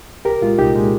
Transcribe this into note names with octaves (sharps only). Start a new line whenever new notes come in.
C2 G4 A#4
A#2 G#3 F4
C2 D#4 G4
A#2 G#3